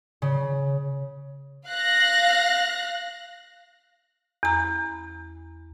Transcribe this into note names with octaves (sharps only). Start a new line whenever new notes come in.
C#3
F5 F#6 A#6
E2 A#5